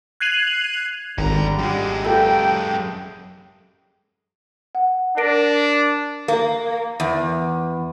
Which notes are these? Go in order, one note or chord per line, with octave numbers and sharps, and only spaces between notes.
F#6 G#6 C7 D#7 F7 F#7
G#1 G2 D3 G3 A#5
F#2 G#3 G4
A#3 A4 B4 G5
F#5
D4 A#4 A#6 D7
A#3
E2